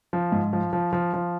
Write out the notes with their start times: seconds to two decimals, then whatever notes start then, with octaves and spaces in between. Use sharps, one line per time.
0.13 F3
0.32 G#2
0.53 F3
0.73 F3
0.93 F3
1.13 F3